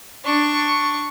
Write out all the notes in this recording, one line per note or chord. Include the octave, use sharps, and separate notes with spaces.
D4 C#6